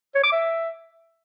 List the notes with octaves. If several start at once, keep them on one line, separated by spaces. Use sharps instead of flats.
C#5
D6
E5